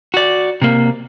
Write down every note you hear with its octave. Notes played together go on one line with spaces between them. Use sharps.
F#4 D5
C3 A#3